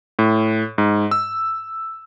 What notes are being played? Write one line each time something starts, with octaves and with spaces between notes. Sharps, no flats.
A2
G#2
E6